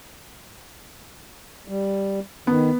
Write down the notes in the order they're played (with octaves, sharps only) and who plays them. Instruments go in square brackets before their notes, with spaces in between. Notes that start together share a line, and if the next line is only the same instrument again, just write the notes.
[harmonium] G3
[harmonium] D#3 [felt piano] B3